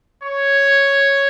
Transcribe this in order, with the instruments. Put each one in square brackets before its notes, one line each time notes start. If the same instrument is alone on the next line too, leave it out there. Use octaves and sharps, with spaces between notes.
[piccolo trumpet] C#5